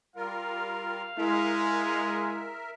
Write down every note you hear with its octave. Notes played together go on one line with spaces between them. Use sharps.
G3 F4 A#4 F5
G#3 E4 A#4 E5